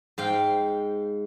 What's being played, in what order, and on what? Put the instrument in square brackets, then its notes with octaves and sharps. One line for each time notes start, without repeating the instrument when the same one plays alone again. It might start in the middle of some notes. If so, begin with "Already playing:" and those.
[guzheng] G#2 F5 G5